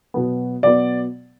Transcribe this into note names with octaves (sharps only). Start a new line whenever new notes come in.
B2 F#3 B3
B2 F#3 B3 D5